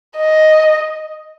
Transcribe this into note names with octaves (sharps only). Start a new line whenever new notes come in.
D#5